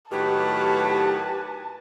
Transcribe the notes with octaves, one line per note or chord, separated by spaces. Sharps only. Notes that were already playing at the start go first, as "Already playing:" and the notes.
A2 D#3 F#3 G4 B4 A5